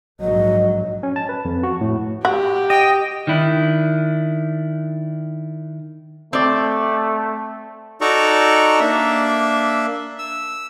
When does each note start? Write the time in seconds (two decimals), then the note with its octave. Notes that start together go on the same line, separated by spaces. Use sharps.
0.20 A#1 G#2 F#3 D#5
1.03 C#4
1.16 A5
1.29 B4
1.45 F2
1.63 F#4
1.81 A2
2.25 F#4 G4
2.70 D#5 G5
3.27 D#3 D4 E4
6.33 A3 C4 D5
8.01 D#4 F#4 A4 D5 A#5 C#6
8.80 A#3 D4 E5
10.19 E6